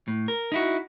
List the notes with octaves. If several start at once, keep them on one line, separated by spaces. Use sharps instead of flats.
A2
A#4
D#4 E4 F#4